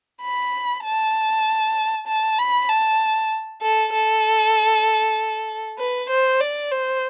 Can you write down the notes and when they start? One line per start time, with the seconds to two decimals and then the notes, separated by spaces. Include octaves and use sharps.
0.22 B5
0.84 A5
2.07 A5
2.38 B5
2.69 A5
3.62 A4
3.93 A4
5.78 B4
6.10 C5
6.40 D5
6.71 C5